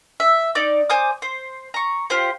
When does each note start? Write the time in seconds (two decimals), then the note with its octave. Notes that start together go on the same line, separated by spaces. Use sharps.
0.20 E5
0.55 D#4 D5 D6
0.90 C5 G#5 D6 D#6
1.22 C5
1.74 A#5 C#6
2.10 F4 G4 C5